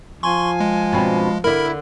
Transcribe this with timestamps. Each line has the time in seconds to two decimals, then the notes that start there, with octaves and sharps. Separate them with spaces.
0.23 F3 G#5 C6 C#6
0.60 G#3
0.92 B2 C4 D4
1.44 D3 A#3 E4 A#4 B5